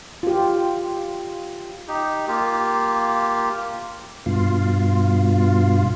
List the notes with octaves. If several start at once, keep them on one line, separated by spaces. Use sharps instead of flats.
F4 G4
D#4 G4
A#3 F4 G4
G2 B2 F4